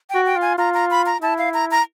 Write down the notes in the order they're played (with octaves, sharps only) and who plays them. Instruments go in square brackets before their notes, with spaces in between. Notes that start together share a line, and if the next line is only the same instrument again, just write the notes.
[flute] G5
[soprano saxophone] F#4
[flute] G5
[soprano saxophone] F4
[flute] G#5
[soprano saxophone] F4 [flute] A#5
[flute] A#5
B5
A#5
[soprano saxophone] E4 [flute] A5
[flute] F5
A#5
A#5